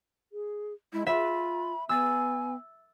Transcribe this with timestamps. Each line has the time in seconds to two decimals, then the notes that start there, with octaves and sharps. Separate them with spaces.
0.32 G#4
0.93 G#3 E4
1.07 F4 E5 B5
1.89 B3 G#5 E6 A6